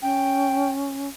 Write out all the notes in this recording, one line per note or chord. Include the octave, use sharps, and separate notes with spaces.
C#4 G5